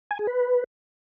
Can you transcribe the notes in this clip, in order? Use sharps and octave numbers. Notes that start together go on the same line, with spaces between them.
G#5
G#4
B4